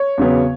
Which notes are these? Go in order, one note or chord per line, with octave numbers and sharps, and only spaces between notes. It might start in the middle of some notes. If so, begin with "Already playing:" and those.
Already playing: C#5
E2 C#3 F#3 B3